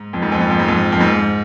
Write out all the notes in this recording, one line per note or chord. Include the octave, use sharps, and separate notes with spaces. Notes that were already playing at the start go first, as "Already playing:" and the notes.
Already playing: G#2
F2
G#2
F2
G#2
F2
G#2
F2
F2
G#2